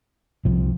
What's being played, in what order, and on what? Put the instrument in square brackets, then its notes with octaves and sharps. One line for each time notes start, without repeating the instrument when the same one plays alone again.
[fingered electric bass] C2 C3 F3